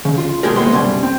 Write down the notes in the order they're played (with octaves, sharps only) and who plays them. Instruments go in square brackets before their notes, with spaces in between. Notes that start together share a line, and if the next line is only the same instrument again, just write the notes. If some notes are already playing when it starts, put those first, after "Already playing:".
[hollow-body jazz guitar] C#3
F4
B2 G#3 G4 G#4 A#4
C2 A#3 B3 C6
C2 F#2 B2 G3 G#5
C4